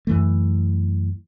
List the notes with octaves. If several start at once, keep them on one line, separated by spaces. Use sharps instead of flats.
F#2 E3 A3